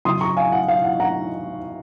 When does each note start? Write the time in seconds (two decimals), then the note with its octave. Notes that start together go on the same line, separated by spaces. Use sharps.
0.05 F#2 C#3 C6 D#6
0.21 A#5 C#6
0.37 F5 G#5
0.52 F#5
0.68 F5
0.84 F#5
1.00 F#5 A#5